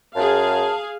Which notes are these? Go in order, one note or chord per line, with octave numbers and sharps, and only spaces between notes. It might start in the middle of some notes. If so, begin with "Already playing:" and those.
F#2 G#4 F5 A5